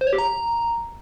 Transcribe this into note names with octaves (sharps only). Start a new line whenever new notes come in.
C5
C#5
G4
A#5